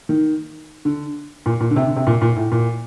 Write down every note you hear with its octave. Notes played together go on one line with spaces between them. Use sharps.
D#3
D3
A#2
A#2
D3
C3
D3
C3
A#2
A#2
A2
A#2